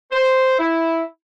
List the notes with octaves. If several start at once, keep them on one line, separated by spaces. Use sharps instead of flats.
C5
E4